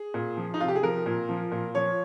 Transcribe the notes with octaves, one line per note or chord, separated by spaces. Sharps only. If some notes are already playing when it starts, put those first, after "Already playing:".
Already playing: G#4
A#2
F3
D#4
C3 F4
G4
G#4
F3 A#4
A#2
F3
A#2
F3 C#5